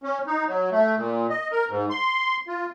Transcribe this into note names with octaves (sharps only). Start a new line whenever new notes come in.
C#4
D#4
F#3
A3
A#2
D#5
A#4
G#2
C6
F4